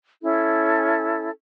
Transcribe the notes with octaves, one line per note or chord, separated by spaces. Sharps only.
C#4 E4 A4